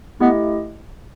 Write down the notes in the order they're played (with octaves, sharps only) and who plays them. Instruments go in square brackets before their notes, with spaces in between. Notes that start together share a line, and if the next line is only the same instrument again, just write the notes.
[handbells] A3 E4 G4 D#5 [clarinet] B3